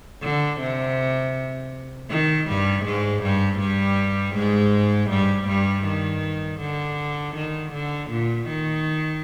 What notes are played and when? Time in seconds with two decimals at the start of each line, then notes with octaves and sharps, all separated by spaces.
0.22 D3
0.60 C3
2.10 D#3
2.48 G2 G3
2.85 G#2 G#3
3.23 G2 G3
3.60 G2 G3
4.35 G#2 G#3
5.10 G2 G3
5.48 G2 G3
5.85 D#3
6.61 D3
7.35 D#3
7.72 D3
8.10 A#2
8.48 D#3